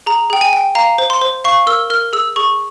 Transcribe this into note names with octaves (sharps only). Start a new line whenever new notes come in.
G#4 A#5
G#4 G5
G#5
G5
F5 A#5
C5
C6
C5
F5 C#6
A#4 E6
A#4 F6
G#4 E6
G#4 C#6